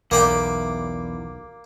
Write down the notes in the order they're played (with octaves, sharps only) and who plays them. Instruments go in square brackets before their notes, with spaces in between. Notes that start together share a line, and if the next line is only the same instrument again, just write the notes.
[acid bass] B1 [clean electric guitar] E2 [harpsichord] A#3 D5 G5